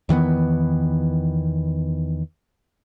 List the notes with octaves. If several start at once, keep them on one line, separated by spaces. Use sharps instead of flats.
E2 D#3 E3 B3